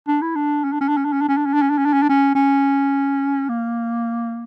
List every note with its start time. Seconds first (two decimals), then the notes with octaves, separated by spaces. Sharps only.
0.08 D4
0.22 E4
0.35 D4
0.64 C#4
0.73 D4
0.81 C#4
0.89 D4
0.97 C#4
1.05 D4
1.13 C#4
1.21 D4
1.29 C#4
1.37 D4
1.46 C#4
1.54 D4
1.62 C#4
1.70 D4
1.78 C#4
1.86 D4
1.93 C#4
2.03 D4
2.09 C#4
2.35 C#4
3.49 A#3